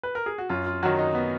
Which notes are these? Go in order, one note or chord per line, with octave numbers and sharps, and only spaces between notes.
B4
A#4
G#4
F#4
F#2 F4
F4
D#3 F#3 F#4
D#4
B3